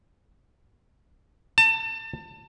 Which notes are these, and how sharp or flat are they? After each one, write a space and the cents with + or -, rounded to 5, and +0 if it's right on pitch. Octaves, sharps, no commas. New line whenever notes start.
A5 +30